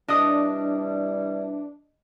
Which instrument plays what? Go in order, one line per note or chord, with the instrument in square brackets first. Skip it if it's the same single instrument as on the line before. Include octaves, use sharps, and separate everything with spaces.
[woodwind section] C3 E3 G3 [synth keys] D4 [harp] D#5 D#6